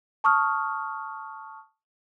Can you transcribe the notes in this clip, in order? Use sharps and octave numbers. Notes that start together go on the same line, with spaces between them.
A5 C#6 D#6 F6